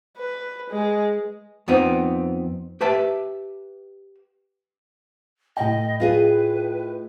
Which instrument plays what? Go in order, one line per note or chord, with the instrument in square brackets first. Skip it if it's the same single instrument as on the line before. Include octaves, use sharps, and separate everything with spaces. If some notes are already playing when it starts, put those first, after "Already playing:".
[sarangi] B4
G#3
[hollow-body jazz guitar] F2 B3 C4 D#4
G4 B4 E5 A5
[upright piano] A2 G5 [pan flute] D#5
[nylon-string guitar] F4 G#4 D#5 [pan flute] B4